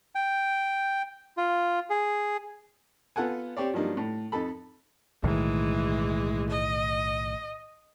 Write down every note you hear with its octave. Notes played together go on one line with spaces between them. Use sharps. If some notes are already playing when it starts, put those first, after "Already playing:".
G5
F4
G#4
B3 F4 A4 F#5 G#5
C4 G4 C#5 D5
G2 F3 F#3 A#3 D4 D#4
A2
F2 D#4 A4 B5
B1 A2 D#3 E3 G#3
D#5